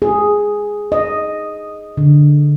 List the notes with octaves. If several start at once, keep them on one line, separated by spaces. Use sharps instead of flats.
G#4
D#5
D3